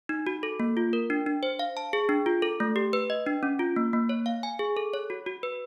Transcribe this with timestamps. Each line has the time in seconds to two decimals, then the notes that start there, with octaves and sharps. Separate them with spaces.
0.09 D#4
0.26 F#4
0.43 A4
0.60 A#3
0.77 F4
0.93 A#4
1.10 D4
1.26 D4
1.43 C5
1.59 F5
1.77 A5
1.93 G#4
2.09 D4
2.26 F4
2.42 A4
2.60 A3
2.76 G4
2.93 B4
3.10 D#5
3.26 D4
3.43 C#4
3.59 F4
3.76 A#3
3.93 A#3
4.09 C#5
4.26 F5
4.43 G#5
4.59 G#4
4.77 A4
4.94 C#5
5.10 F#4
5.26 F#4
5.43 B4